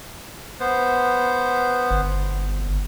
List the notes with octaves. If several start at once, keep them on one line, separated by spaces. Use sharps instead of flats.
B3 C5
G1